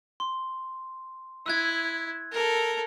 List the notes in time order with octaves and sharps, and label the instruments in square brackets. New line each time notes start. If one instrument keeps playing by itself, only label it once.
[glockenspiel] C6
[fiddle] E4 [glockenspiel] E6 F#6 G#6
[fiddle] A4 A#4